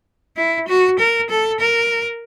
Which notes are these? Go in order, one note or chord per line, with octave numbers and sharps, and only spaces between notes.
E4
F#4
A#4
A4
A#4